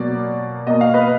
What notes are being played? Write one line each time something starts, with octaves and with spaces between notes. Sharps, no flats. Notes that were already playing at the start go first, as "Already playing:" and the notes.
Already playing: B2 F#3 A#3 D5
B2 A#3 D#5
F5
B4 D#5